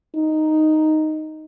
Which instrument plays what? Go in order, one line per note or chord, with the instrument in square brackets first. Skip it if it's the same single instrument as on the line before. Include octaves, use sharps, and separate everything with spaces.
[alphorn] D#4